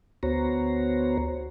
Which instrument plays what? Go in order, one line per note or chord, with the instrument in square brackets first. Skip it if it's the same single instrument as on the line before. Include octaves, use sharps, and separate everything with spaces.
[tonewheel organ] D2 B3 F#4 C5 C#5 A#5